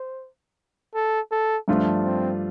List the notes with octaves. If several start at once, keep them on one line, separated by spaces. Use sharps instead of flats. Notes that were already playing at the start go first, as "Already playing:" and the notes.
Already playing: C5
A4
A4
G2 F3 A3 D4 F4
C4